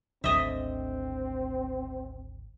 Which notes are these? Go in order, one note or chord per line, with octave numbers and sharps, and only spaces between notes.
G#1 D2 D3 C4 D#5 E5